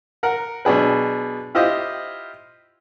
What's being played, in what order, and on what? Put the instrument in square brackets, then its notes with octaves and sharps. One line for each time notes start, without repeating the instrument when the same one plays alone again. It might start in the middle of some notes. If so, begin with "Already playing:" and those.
[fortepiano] A#4 F#5
B2 F#3 D4 G#4 B4
E4 F4 G4 C5 D#5